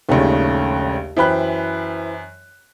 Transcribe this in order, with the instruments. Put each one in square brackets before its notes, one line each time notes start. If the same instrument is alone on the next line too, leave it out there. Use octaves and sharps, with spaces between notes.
[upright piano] A#1 G#3 A3 [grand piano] D#2 C#3
[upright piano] F#2 G5 F#6 [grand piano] E3 C5 B5